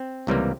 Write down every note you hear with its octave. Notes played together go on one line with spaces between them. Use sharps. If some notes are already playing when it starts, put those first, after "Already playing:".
Already playing: C4
C#2 C3 E3 G3 A#3